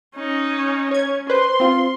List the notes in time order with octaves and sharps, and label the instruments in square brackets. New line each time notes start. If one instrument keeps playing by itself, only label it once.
[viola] C#4 D#4
[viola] C#4 [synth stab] C#5 G#6
[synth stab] B4 C5 [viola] C6
[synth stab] C4 F4